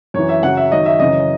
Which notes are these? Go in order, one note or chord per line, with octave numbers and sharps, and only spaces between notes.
F#2 E3 C#5
E5
F#2 C#3 F#3 F#5
E5
F#2 D#3 F#3 D#5
E5
F#2 C#3 E3 D#5